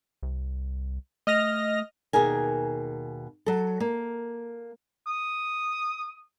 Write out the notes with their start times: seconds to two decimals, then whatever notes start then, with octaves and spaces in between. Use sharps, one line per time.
0.23 C2
1.27 A3 D#5 F6 A#6
2.13 D#2 B2 G#4 A#4 G#5
3.46 F#3 A4
3.80 A#3
5.07 D#6